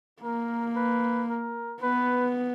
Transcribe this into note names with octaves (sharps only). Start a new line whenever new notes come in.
A#3 A#4
B4
A#4
B3 B4